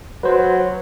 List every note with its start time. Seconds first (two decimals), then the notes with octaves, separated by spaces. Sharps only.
0.23 F#3 B4 C5